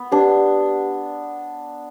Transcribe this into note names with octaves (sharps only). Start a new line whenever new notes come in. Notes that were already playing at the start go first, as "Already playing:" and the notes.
Already playing: B3
D4 G4 B4 D5